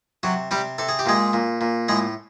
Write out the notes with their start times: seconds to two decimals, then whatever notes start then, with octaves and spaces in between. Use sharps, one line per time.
0.23 C3 F#3 F#4
0.51 C3 G3 G4
0.78 C3 A4
0.88 G#4
0.99 G4
1.06 A#2 G#3 G#4
1.33 A#2
1.61 A#2
1.88 A2 G#3 G#4